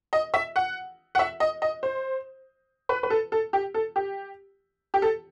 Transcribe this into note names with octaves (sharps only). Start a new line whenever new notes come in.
D#5
E5
F#5
F#5
E5
D#5
D#5
C5
B4
B4
A4
A4
G4
A4
G4
G4
A4